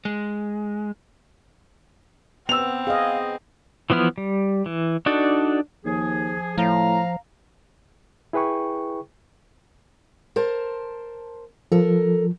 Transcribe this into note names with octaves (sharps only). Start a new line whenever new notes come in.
G#3
B3 C4 E6 F7
G#4 D#5 F5
E3 F3 B3 E4 F6
G3
E3
D4 D#4 F#4 A4 D5
D#2 F3 G#4
A2 F3 F5 A#5
E4 G#4 B4 G5 C#6
A#4 C5 A5
F3 A4 A#4